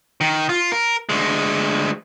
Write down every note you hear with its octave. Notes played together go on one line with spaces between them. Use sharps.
D#3
F4
A#4
D2 G#3